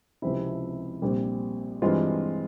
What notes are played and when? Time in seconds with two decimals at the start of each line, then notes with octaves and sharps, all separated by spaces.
0.22 C#2 C3 F3 C4 E4
1.02 A#1 A#2 G3 C4
1.82 G2 E3 G#3 C4 F4